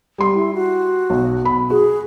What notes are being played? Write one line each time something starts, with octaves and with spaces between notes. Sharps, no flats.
G3 C6
E4
F#4
B1
B2 B5
F#4 G#4